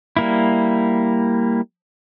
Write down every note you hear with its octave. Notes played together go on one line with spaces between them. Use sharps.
G3 A#3 E4